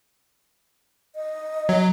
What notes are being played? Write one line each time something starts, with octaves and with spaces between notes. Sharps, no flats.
D#5
F#3